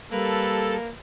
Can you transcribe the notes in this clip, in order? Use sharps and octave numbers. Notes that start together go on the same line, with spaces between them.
G3 A#3 A4 B4